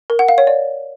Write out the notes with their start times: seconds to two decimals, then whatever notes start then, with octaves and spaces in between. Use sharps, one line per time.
0.10 A#4
0.19 F#5
0.28 F5
0.38 C#5
0.47 D5